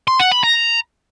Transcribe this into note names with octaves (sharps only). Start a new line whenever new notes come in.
C6
F#5
B5
A#5